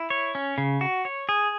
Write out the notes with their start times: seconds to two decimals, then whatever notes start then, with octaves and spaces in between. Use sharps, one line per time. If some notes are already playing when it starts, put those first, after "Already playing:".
Already playing: E4
0.10 C#5
0.35 C#4
0.58 C#3
0.81 F#4
1.05 C#5
1.29 G#4